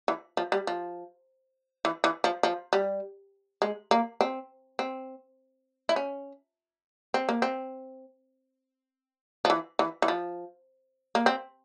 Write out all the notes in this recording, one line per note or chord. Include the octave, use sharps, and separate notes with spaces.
E3
F3
G3
F3
E3
E3
F3
F3
G3
G#3
A#3
C4
C4
E4
C#4
C4
A#3
C4
F3
E3
E3
E3
F3
A#3
C4